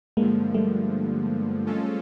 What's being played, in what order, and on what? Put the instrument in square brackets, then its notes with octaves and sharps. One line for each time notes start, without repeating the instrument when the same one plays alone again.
[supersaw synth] G2 D3 F3 [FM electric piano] G#3 A#3
[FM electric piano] G3 A3
[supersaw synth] F3 G#3 C#4 F4 A4